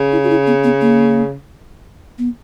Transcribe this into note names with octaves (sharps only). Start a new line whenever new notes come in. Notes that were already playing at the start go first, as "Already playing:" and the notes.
Already playing: C#3
E4
F#4
E4
B3
B3
A#3
B3